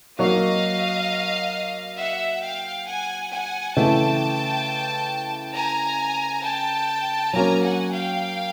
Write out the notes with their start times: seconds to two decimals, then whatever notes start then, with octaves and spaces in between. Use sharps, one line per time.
0.19 F#3 A#3 D#4 F#4 D#5 F5
1.99 E5 F#5
2.42 F5 G5
2.87 F#5 G#5
3.32 F#5 G#5
3.76 C#3 E3 A3 G5 A5
5.55 G#5 A#5
6.44 G5 A5
7.33 F#3 A#3 C#4 G#5 A#5
7.63 F#5 G#5
7.93 F5 G5